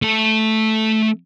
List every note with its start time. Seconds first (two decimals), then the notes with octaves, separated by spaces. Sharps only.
0.02 A3 A4